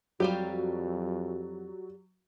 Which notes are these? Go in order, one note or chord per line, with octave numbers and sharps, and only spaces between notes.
F2 F#3 G3 F4 G4